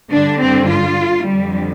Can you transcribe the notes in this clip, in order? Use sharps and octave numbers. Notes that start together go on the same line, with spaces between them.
G2 D3 D4
C4
F4
F2 D3 G3